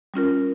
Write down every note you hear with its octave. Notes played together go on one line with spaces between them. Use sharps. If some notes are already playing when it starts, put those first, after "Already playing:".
G3 C#4 F4 A#4